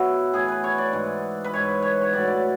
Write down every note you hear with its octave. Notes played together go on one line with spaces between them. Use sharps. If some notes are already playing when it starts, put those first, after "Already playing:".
Already playing: B2 F#3 E4 F#4
A2 E3 G#4
B4
C#5
D5
G#2 E3
B4
G#2 E3 C#5
C#5
C#5
A2 F#3 D5
D5